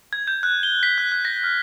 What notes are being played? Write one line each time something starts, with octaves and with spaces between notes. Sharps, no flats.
G#6
G6
F#6
G7
B6
F#6
F#6
A#6
F6